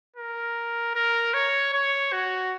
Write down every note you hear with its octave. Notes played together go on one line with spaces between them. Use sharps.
A#4
A#4
C#5
C#5
F#4